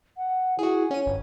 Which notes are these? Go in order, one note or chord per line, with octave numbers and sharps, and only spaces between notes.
F#5
E4 F#4 G#4
C#4 C#5 D#7
G1